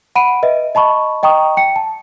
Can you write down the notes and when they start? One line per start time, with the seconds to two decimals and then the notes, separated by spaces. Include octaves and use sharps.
0.15 F#5 B5 D7 D#7
0.43 B4 D#5 E5
0.75 D#5 A5 B5 C#6
1.23 D#5 G5 A#5 C#6 D#6
1.57 G5 C#7
1.76 A5